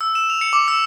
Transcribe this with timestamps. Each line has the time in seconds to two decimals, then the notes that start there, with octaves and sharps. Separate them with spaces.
0.01 E6
0.15 E7
0.30 F7
0.41 C#7
0.53 D6
0.68 E6